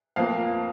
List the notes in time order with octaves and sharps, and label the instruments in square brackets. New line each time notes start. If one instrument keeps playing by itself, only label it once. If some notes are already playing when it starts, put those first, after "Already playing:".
[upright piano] F2 F3 A#3 F5